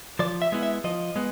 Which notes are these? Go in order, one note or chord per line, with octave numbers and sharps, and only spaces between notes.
F3 D5
E5
G#3 B3 E4
E5
F3 D#5
G#3 B3